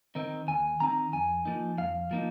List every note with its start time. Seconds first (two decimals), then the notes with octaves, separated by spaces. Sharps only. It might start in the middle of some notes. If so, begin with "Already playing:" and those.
0.15 D#3 C4 D#4
0.48 D#2 G#5
0.80 D#3 C4 D#4 A#5
1.13 F2 G#5
1.45 F3 A#3 D#4
1.78 F2 F5
2.11 F3 A#3 D#4